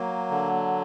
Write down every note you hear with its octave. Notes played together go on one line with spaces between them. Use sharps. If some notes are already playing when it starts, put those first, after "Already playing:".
Already playing: F#3 A#3
D3